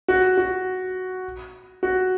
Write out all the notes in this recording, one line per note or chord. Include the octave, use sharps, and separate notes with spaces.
F#4
F#4
F#4